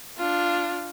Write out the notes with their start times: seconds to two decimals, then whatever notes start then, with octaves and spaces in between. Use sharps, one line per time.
0.17 D4 F4